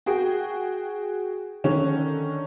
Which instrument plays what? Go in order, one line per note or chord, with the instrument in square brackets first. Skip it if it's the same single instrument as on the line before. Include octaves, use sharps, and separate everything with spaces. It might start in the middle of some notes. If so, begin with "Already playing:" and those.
[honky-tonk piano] F#4 G#4 G5
D3 D#3 C#4